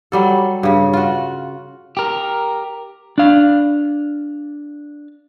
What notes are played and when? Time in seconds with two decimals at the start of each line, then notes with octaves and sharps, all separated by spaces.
0.12 F#3 G3 A4
0.63 G2 C#3
0.94 F4 F#4
1.97 G4 A#4
3.18 D4 F5